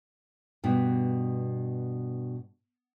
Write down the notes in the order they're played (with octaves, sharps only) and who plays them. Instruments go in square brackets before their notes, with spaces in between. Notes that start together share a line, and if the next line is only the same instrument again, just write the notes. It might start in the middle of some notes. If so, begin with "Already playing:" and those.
[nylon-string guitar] G2 B2